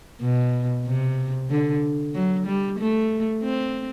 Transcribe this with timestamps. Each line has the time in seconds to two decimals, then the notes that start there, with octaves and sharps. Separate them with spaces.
0.21 B2
0.86 C3
1.50 D3
2.14 F#3
2.46 G3
2.79 A3
3.42 C4